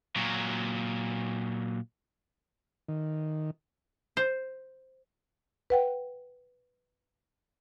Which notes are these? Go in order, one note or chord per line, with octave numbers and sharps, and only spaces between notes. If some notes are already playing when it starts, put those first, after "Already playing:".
A#2 F#3
D#3
C5
B4 F#5 G5